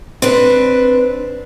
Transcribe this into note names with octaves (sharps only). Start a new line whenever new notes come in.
C4 D4 B4